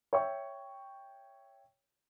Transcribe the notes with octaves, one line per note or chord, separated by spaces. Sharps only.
C#5 E5 G5 C#6